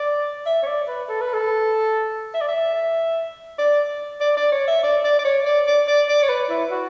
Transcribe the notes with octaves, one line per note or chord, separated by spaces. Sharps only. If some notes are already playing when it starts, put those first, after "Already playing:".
Already playing: D5
E5
C#5
D5
B4
A4
B4
A4
E5
D5
E5
D5
D5
D5
C#5
E5
D5
D5
D5
C#5
D5
D5
D5
D5
C#5
B4
E4
F#4